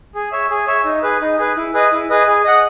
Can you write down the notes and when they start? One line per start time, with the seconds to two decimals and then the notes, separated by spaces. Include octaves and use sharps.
0.15 G#4
0.32 C#5 E5
0.50 G#4
0.67 C#5 E5
0.85 D#4
1.03 G#4 B4
1.21 D#4
1.38 G#4 B4
1.57 E4
1.74 G#4 B4 D#5
1.92 E4
2.10 G#4 B4 D#5
2.27 G#4
2.44 D#5 F#5